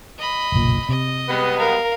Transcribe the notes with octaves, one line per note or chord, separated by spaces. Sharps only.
D#5 B5
F#1 B1 A#2
C3 D#5
G3 G#3 B3
A#4 F5